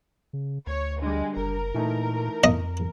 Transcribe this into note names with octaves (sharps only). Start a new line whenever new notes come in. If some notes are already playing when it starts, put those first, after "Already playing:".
C#3
D2 C#5
D3 G3 G#3
F#1 A#4
A#2 E3 A3 D#4
F2 D#5